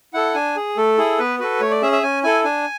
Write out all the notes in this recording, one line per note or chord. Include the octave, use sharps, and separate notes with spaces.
E4 A4 F#5
D4 G#5
G#4
A3 A4
E4 G#4
B3 B4
F#4 A4 B4
A3 C#5
D5
C#4 G#4 E5
E5
C#4 G#5
E4 A4 G#5
D4 G#5